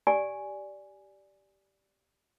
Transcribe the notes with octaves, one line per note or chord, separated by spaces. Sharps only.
G4 D5 G#5